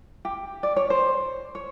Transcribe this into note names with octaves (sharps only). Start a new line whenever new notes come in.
G4
D5
C#5
C5
C#5